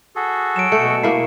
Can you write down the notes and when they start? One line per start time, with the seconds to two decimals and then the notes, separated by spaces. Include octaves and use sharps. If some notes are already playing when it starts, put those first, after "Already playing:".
0.16 F#4 G#4 A4
0.56 F#3 D7 E7
0.72 B2 A3 C#7
1.03 A#3 E4 C7